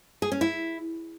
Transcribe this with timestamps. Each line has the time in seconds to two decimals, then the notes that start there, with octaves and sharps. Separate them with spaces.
0.22 G#4
0.32 C#4
0.41 E4